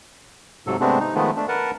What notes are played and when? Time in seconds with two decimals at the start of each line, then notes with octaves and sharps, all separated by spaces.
0.67 G#2 C3 F#3 A4
0.80 C3 G#3 A3 B3 C4 D4
1.00 D#4
1.15 D#3 F3 G#3 A3 B3
1.36 A3 D4
1.48 A#4 B4 F#5 A5